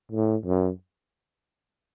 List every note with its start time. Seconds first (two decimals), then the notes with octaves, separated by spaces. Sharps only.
0.12 A2
0.45 F#2